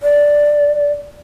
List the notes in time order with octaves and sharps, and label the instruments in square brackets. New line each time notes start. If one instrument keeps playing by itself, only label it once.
[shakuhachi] D5